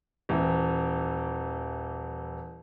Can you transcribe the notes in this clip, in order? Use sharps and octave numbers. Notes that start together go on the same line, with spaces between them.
D#1 E3